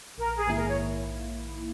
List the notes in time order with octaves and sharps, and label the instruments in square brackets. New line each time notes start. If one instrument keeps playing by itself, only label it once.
[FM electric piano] A#1 [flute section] A#4
[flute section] G#4
[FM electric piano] G#2 D#3 A#3 E4
[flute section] A#4
C#5